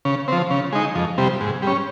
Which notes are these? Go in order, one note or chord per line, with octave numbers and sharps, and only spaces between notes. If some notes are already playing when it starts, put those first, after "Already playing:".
C#3
F3 C4
C#3
G#3 D#4
F2
C3 G3
G#2
G3 C#4